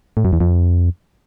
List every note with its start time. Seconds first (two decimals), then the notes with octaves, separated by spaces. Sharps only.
0.17 A2
0.25 F#2
0.33 E2
0.40 F2